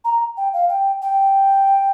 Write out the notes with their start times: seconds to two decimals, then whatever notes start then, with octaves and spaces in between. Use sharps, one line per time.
0.05 A#5
0.37 G5
0.54 F5
0.69 G5
1.02 G5